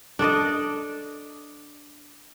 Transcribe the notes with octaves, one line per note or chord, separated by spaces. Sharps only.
D4 A4 D5 D#5